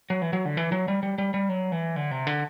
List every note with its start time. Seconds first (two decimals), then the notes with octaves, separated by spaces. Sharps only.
0.10 F#3
0.22 E3
0.33 F#3
0.45 D3
0.57 E3
0.72 F#3
0.88 G3
1.03 G3
1.18 G3
1.34 G3
1.49 F#3
1.72 E3
1.96 D3
2.11 C3
2.27 D3